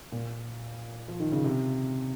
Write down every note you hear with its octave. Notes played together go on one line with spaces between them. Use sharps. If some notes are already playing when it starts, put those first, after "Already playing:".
A#2
F3
D#3
C#3
C3